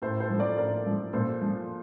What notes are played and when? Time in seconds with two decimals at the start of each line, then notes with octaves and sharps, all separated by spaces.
0.02 A2 A4 C5
0.20 A4 C5
0.30 F3
0.39 A#4 D5
0.58 A2 A#4 D5
0.86 F3
1.13 A#2 A4 C5
1.41 F3